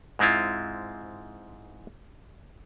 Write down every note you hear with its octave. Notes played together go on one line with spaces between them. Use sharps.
G#2 G#3 C4 E4 F4